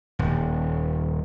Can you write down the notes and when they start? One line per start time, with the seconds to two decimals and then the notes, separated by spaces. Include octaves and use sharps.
0.19 D#1